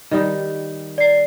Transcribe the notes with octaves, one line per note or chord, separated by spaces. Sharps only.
D#3 G3 D#4
D5 C7